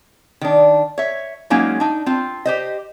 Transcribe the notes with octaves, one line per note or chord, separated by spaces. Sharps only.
D#3 D4
C#5 E5
F#3 G#3 A#3 C#4 D#4 F4
D4 D#4
C4 F4
G4 C5 D#5